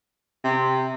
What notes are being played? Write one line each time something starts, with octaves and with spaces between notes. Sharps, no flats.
C3